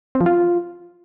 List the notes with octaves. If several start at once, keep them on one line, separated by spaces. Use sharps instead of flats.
C4
F3
F4